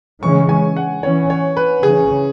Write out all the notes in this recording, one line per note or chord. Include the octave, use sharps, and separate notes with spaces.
C#3 E3 G#3 C#4 C#6
G#5
F#5
E3 C#4 C#5
C#5
B4
C#3 E3 C#4 G#4